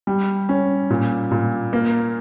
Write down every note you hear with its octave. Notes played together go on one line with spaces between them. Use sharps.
G3
C#4
A#2
A#2
A#3